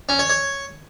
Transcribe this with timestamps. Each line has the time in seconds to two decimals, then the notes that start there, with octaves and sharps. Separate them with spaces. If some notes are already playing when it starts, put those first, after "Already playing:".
0.09 C#4
0.19 C#5
0.30 C#5